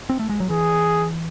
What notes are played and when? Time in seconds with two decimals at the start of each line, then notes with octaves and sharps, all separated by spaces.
0.09 C4
0.19 A3
0.29 G#3
0.40 F#3
0.50 E3 G#4